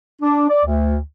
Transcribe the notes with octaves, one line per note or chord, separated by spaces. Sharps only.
D4
D5
D2